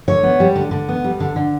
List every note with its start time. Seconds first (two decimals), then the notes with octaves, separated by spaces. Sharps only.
0.08 D3 C#5
0.23 B3
0.40 G3
0.56 D3
0.71 D3
0.89 B3
1.04 G3
1.20 D3
1.36 D3